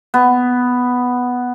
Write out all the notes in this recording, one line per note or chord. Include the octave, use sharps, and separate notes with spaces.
B3